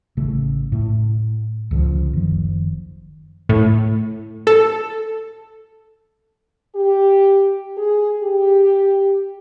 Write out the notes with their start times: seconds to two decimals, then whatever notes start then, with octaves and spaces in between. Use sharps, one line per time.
0.17 A1 C#3 A3
0.72 A2
1.71 C#2 D3 E3 F3
2.13 F#1 D#3 F3
3.49 A2
4.47 A4
6.75 G4
7.77 G#4
8.22 G4